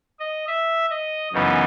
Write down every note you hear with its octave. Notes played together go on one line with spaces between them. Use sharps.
D#5
E5
D#5
F#2 C#3 E3 B3 D#4